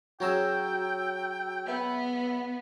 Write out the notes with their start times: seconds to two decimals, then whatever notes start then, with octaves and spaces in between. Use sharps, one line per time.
0.20 F#3 C#4 F#4 G#4 G5 A#5 E6
1.68 B3 E5